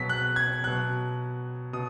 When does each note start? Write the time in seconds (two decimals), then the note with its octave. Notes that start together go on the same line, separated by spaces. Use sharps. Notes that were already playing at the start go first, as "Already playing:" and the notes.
Already playing: B2 F#3 B6
0.09 F#6
0.36 G#6
0.63 B2 F#3 F#6
1.73 B2 D#6